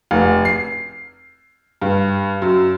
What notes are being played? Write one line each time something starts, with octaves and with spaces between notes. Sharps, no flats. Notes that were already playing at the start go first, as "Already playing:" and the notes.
F1
C7
G2
F#2